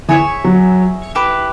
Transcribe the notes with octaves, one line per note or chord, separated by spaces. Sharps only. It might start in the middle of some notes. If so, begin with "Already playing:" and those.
E3 G#4 C#5 E5 G#5
F#3
E4 G4 B4